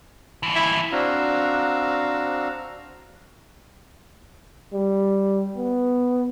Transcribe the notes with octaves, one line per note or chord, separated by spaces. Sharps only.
D#2 E3
E4
C4 D4 F#4 F5 A#5 E6
G3
B3